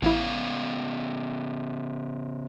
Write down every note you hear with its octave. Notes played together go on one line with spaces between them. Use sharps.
A1 C#3 B3 E4 F5